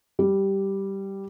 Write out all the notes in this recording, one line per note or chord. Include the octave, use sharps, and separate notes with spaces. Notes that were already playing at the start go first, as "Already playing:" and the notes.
G3